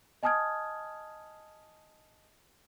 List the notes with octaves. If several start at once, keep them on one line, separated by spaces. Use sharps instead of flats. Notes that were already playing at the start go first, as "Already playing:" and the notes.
D#5 G#5 A5 D#6 F6 G#6